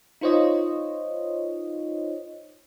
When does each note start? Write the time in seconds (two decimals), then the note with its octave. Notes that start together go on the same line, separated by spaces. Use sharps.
0.21 D#4 F4 C5 C#5 D#5